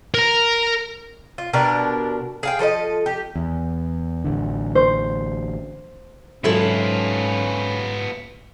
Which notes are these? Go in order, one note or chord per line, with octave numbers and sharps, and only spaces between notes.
A#4 A#5
F4
B2 D4 G4 A#4
G#4 F5 G5
F3 A4 C5 D#5
G4
E2
A1 D3
C5
G#2 F#3 B3 C#4 E4 F4 A4 C5